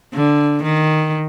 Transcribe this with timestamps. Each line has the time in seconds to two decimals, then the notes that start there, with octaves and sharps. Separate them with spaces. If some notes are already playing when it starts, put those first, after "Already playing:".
0.14 D3
0.63 D#3